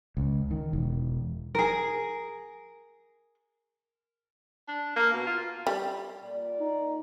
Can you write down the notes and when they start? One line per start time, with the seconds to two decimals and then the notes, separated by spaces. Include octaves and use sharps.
0.17 C#2
0.51 D#3
0.73 E1
1.55 G#4 A#4
4.68 D4
4.96 A#3
5.13 B2
5.27 F4
5.67 G3
6.22 A#2 D5
6.59 D#4